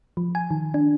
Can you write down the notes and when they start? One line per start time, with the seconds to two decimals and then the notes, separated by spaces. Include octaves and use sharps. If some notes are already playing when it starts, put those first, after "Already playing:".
0.17 F3
0.35 G#5
0.51 D#3
0.74 D4